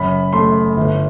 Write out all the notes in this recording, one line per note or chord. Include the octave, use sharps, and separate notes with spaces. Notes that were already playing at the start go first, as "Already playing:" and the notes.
Already playing: F#1 F#2 F#3 B5
A3 C6
G1